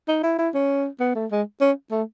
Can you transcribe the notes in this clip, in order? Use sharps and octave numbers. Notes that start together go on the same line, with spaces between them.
D#4
E4
E4
C#4
B3
A3
G#3
C#4
A3